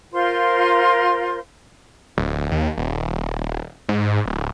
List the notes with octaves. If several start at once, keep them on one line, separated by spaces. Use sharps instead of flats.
F4 A#4 C5 C6
D1
D#2
D#1
G#2
D1